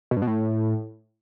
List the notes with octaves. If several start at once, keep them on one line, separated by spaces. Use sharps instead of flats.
B2
G2
B2
A2